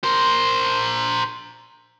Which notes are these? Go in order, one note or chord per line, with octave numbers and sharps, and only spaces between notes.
A#4 C5